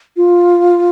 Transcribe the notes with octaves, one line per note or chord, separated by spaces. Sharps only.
F4